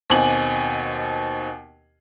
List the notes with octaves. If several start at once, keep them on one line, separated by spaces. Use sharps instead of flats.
D#2 B2 C4 G#5 F#7